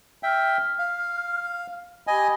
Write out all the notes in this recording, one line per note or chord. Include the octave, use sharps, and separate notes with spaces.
E5 G5 F6
F5
G4 D#5 G#5 B5 D#6